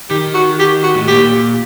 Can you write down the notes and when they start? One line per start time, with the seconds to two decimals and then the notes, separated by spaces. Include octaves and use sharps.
0.10 D#3 G4
0.34 F#4
0.59 G4
0.83 F#4
0.95 A2
1.08 A#2 G4